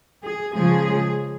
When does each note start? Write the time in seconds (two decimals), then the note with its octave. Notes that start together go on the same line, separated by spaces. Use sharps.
0.24 G#4
0.53 C#3 F3 G#3 G#4